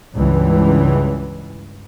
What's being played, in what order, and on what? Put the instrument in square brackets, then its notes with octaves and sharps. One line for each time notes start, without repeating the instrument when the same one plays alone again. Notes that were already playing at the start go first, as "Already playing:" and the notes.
[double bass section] C#2 G2 E3